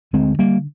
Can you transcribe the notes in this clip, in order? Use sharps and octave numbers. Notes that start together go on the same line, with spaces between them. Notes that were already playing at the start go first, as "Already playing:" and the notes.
D2 D3 G#3 C4
G3 A#3